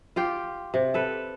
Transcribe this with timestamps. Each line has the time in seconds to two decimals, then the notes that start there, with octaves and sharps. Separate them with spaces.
0.16 F4 G4 G5
0.74 C3
0.94 A4 B4